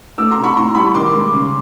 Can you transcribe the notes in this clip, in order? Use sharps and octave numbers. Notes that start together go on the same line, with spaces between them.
A3 D6 E6
A#5 C6
C3
B5 C#6
A2 A#5 C6
G3 B5 C#6
D#3 C6 D6
G#3
C#3